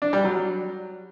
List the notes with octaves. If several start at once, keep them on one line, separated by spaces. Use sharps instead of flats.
D4
G3
F#3